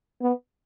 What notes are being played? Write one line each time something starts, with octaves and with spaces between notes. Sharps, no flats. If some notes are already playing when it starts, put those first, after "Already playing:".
B3